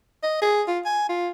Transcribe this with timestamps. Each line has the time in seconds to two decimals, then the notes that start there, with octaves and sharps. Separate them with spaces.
0.23 D#5
0.42 G#4
0.68 F4
0.85 G#5
1.09 F4